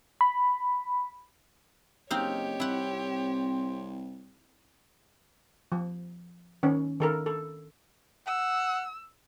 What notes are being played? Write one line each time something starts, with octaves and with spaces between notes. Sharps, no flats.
B5
F#1 C4 D#4 G4 C#5 F5
C2 C4 E4 F#5
F3
D#3 C#4
D#3 A4 A#4
A4
F#5 E6